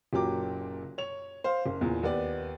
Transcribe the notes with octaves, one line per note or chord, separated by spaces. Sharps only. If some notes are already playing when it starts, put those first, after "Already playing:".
F#1 A#2 F#3 G4 D6
C#5 F7
C5 F5
F#1
E2 A#2
D#2 B3 D5